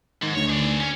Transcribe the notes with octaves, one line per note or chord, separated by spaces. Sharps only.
G#2 D#3
D2 C#5
G#4 D5
C#4